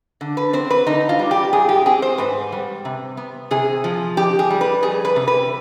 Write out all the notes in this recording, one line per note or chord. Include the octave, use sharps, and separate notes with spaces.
D3
B4
C4 C5
B4
D3 D#4
F4
G3
G4
G#2 G#4
G4
C4 G#4
C5
G#2 B4
G3
C3
B3
C3 G#4
F3
F2 G4
G#4
G3
B4
F2 G#4
B4
C3
B4